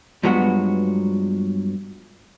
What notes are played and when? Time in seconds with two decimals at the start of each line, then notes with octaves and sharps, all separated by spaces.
0.23 G2 F3 F#3 G#3 B3 F#4